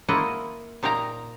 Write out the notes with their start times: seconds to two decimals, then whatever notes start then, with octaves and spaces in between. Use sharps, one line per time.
0.08 A#3 E4 F4 D#5 F#5
0.83 A#2 D#4 F5 G5 A#5